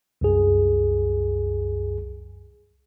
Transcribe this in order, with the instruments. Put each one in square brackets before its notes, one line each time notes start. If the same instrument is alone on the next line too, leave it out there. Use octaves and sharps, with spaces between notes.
[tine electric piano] C2 F#2 G#4